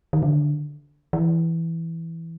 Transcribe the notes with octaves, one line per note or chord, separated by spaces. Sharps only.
D#3
D3
E3